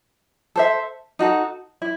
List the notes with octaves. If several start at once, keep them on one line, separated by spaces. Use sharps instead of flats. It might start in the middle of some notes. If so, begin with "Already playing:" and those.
A4 C5 E5
D#4 F#4 A4
E4